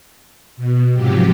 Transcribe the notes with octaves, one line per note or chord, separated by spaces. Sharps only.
B2
G#2 C3 F3 F#3 G4